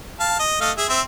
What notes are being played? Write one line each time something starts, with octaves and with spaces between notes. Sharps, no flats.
F5 A5
D#5
A3 D#5 F5
G#4 E5
C4 E5